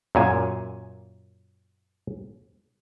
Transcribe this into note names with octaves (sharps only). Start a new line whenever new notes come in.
F#2 A#2 G#5